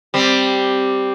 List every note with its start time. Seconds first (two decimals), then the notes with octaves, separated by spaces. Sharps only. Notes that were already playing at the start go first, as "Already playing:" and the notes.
0.14 G3 C4